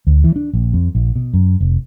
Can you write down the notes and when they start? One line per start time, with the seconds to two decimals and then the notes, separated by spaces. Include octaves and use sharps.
0.07 D2
0.24 E3
0.36 D4
0.53 A#1
0.73 F2
0.95 A#1
1.16 B2
1.33 F#2
1.60 F1